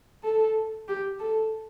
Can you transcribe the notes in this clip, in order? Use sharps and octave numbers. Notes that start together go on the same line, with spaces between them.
A4
G4
A4